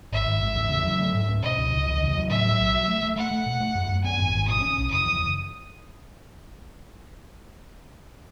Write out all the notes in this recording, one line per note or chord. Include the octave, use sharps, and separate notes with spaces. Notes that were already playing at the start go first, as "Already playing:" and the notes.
G#1 E5
G#1
G#1
E2
C#3
F#3
A3
G#2
C#4
B2 D#5
C#2
C#2
E2
C#3
F#3
A2 E5
F#3
B1
F#3
A3
A3
A3 F#5
A3
B2
A3
F#2
F#2
B3 G#5
G#1
G#1
B2 D#6
C#4
B1
F#1 D#6
E2